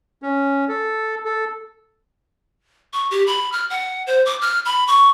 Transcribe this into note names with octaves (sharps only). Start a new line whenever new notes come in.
C#4
A4
A4
C#6
G4
B5
F6
F#5
C5
D6
F6
B5
C#6